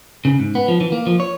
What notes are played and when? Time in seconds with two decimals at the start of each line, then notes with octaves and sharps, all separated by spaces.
0.25 C#3
0.40 G#2
0.55 B3
0.68 F3
0.81 E3
0.92 A#3
1.06 F3
1.20 C#5